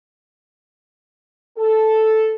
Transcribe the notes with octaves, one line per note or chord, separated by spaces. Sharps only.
A4